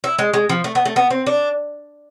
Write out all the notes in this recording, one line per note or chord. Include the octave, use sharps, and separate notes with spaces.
E4
G#3
G#3
F3
A3
B3
A3
B3
C4
D4